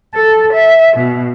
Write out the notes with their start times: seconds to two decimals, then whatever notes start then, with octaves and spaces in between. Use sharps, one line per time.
0.13 A4
0.51 E5
0.95 B2